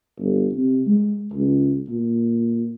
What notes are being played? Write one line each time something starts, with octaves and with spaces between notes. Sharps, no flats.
G1
C3
G#3
C#2
A#2